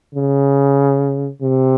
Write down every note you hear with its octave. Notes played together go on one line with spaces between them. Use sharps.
C#3
C3